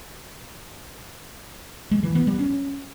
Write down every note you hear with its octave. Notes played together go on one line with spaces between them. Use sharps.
G#3
E3
B3
G3
C#4